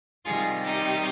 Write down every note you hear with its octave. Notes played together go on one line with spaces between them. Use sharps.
C3 D#3 G3 F4 G#4
D#4 G4